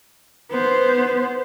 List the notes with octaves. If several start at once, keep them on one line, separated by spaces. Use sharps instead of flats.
B3 C5